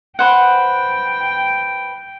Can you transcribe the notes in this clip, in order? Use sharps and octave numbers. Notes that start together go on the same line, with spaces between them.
B4 C5 F#5 G5